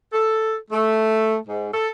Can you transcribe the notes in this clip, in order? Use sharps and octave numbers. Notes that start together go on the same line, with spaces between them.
A4
A3
G#2
A4